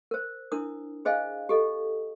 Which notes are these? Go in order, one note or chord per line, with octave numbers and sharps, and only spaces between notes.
A#4 C5
D4 E4 A#4 D#6
G#4 C5 D#5 F5 G#5
G4 A4 D#5